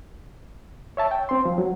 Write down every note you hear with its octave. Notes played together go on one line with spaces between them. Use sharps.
C#5 E5 A5
G5
C4 C6
F3
F#3